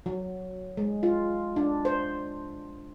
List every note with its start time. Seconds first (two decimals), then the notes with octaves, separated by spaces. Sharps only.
0.06 F#3
0.77 G#3
1.03 F4
1.56 D4
1.85 C5